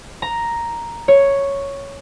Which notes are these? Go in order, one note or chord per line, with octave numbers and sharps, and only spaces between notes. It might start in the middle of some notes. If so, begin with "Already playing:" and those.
A#5
C#5